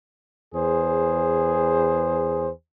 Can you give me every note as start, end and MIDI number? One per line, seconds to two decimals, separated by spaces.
0.55 2.50 40
0.55 2.50 68
0.55 2.50 72